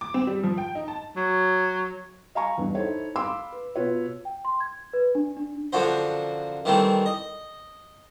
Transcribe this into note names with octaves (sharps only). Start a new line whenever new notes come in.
D6
C4
G3
F3
G5
D#4
A5
F#3
D#5 F5 G#5 A#5 C#6
E2 G2
D#4 E4 A4 C5 C#5
F5 B5 C6 D6 E6
B4
B2 F4 B4 C#5
G5
C6
G#6
B4
D4
D4
F#2 D3 F3 F#4 C5
D#3 E3 G3 A3 C4
D#5